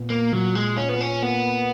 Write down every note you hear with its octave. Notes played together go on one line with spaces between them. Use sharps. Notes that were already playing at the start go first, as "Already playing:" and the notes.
Already playing: A#2 B3
A#3
A#2 F#3
G#3
C#4 F4
B3
C#4
A#3 B3